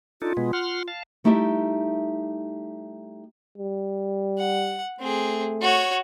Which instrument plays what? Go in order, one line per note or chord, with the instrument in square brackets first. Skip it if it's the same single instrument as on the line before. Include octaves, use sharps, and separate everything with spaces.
[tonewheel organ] D4 D#4 A4 [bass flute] F4
[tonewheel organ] B2 G#3 B3
F#5 C6 F6
F5 A5
[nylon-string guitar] G3 A3 D#4 E4 G4 E5
[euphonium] G3
[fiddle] F#5
[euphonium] A3 [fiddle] C4 G#4
[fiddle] F#4 C#5